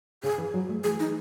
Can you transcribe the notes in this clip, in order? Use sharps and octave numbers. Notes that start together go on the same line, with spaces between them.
C#3 G#4
E3
F#3
A3
E3 G#4
D#4